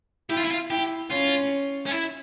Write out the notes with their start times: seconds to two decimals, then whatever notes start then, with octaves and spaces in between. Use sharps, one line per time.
0.30 E4 G4
0.37 F4
0.44 E4
0.51 F4
0.70 E4 G4
1.10 C#4 F4
1.86 C#4
1.91 E4